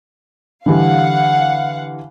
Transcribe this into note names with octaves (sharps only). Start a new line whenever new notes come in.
D3 E3 G3 F5 F#5